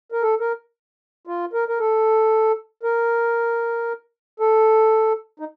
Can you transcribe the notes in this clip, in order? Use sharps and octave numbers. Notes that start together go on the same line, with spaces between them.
A#4
A4
A#4
F4
A#4
A#4
A4
A#4
A4
D#4